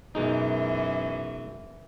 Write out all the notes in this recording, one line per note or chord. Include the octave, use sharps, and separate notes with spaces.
F#2 B2 E3 G#3 D#4